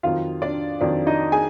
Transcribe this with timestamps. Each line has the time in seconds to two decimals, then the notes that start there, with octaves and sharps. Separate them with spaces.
0.03 F2 D#3 F#3 F4 F5
0.42 D4 D5
0.81 F2 D#3 F#3 D4 D5
1.07 D#4 D#5
1.32 G#4 G#5